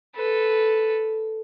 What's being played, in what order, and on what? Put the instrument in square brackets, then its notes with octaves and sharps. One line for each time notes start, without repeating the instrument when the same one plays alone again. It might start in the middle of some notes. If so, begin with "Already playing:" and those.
[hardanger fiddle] A4 B4